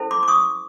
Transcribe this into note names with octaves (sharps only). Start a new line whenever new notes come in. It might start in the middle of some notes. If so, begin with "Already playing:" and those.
Already playing: C#4 E4 A4 C5
C6 D6
D6
C#6 D#6